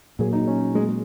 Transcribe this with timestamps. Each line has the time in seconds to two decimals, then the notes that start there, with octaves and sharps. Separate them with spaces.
0.19 A#2 F#3 A#3 G#4
0.33 D#4
0.47 C#4
0.75 G#3